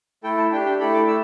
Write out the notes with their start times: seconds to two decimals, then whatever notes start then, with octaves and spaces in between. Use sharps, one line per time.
0.24 A3 E4 A4 G5
0.38 A5
0.52 D4 G5
0.56 G4
0.66 G5
0.80 A3 E4 A4 B5
0.94 D6
1.07 A3 E6